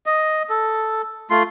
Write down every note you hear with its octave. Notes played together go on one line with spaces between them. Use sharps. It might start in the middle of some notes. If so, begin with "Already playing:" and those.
D#5
A4
A3 F4 C6